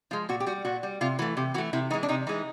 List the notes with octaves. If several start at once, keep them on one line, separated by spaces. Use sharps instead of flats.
F3 G#3 F4
A#2 F#4
G4
G3 F#4
A#2 F#4
G3
C3 F4
E3 A3 F#4
C3 G4
E3 A3 F#4
C3 E4
E3 G#3 D#4
D4
C3 D#4
E3 G#3 D#4